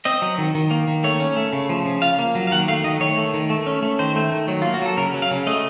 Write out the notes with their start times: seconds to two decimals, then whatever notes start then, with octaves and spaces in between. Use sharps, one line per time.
0.05 C4 D#5
0.22 F#3
0.38 D#3
0.55 D#3
0.71 A#3
0.88 D#3
1.04 A3 C#5
1.20 C#4
1.37 A3
1.53 C#3
1.69 F3
1.86 C#3
2.02 F4 F5
2.19 A#3
2.35 F#3
2.47 F5
2.51 D#3 F#5
2.68 A3 F5
2.84 D#3 D#5
3.00 D#3 C#5
3.17 A3
3.34 D#3
3.50 A3
3.66 C#4
3.83 A3
3.99 D#3 C5
4.16 A3
4.32 D#3
4.48 F#3
4.62 A#3 F4
4.74 F#4
4.81 F#3 A4
4.97 C#3 A#4
5.14 F#3
5.22 F5
5.31 C#3
5.47 A3 D#5